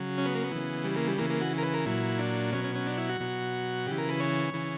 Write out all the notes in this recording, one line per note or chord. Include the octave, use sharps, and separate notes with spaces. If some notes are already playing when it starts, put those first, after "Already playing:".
Already playing: C#3 F#3
C#4
B3
A#3
B3
C#3 E3
G3
A#3
G3
C#3 E3 A#3
A#3
F#4
A#4
B4
A#4
A#2 F#3 E4
D4
B2 F#3 C#4
C#4
C#4
D4
E4
F#4
B2 F#3
C#3 E3 G4
A#4
B4
C#5
C#3 E3